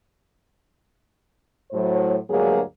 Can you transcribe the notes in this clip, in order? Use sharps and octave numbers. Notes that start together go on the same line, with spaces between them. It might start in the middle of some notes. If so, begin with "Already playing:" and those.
A2 F#3 C5
D2 G2 F#3 G#3 A#3 G#4